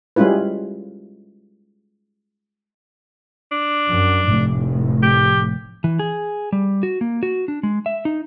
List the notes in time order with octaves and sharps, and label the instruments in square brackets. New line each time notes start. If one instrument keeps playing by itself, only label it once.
[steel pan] G3 G#3 C#4 E4 F4 B4
[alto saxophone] D4
[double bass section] F#2
F1 A2
[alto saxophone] G4
[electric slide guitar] E3
G#4
G3
F#4
A#3
F#4
D4
G#3
E5
D#4